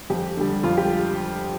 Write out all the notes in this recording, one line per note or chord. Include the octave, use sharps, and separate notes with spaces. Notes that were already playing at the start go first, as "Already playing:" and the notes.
F2 G4
D3 G3
F2 F4
G4